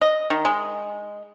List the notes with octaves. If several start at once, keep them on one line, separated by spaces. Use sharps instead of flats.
D#5
D#3
G#3